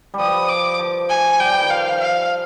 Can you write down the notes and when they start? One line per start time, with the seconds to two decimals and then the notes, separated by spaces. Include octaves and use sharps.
0.14 G3
0.19 F3 D#6
0.49 D6
0.79 F3
1.10 G#5
1.40 G3 G5
1.51 F3
1.62 D#3
1.70 F3 F5
2.00 F5